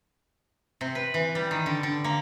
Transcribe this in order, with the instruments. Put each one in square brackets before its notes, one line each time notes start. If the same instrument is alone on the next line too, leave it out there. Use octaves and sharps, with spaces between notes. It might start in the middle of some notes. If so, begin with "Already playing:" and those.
[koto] C3
B4
E3
G3
D#3
D3
D3
A#3